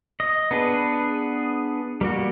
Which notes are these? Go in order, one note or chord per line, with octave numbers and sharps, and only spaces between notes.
D#5
B3 D4 G#4 B4
G3 A#3 F#4